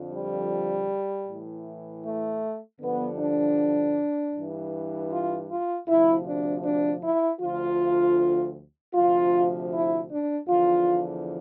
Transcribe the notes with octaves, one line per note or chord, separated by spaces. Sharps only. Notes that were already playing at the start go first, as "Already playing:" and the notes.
Already playing: F2 D3 F3
G3
A2 E3
A3
G2 D3 F3 B3
D4
G2 E3
F4
F4
D2 C3 F3 E4
D4
D4
E4
D2 D3 F3 F4
D2 C3 F3 F4
E4
D4
E2 D3 F3 F4